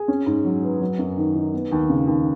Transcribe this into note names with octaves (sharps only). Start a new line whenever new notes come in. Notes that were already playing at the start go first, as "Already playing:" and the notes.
Already playing: G#4
C#4
G#2
F#3
B4
F#3
F#2
D#3
D#4
B3
D#2
C#3
D#2